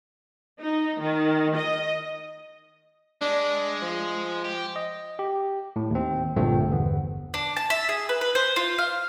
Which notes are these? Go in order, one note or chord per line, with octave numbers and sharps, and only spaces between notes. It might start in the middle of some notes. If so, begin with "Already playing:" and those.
D#4
D#3
D#5
G#3 D4
F3
G4
D#5
G4
A2
D#2 C4
A#1 G2 D3 F3 A3 C4
G1 E2 B3
D4
A5
E5
G#4
B4
B4
C5
F4
F5